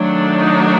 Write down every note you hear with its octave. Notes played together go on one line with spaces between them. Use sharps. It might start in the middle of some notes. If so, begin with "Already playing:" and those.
Already playing: D#3 F#3 A3 D4
D#4